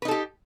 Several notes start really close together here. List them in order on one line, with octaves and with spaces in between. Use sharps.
B4 D#4 A4 G4